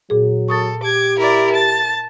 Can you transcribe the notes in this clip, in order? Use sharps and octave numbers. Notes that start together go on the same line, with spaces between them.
A#2 F#3 G#4
A4 C#6 D#6 A6
G4 D6 G#6
E4 A#4 D5
A#4 A5 A6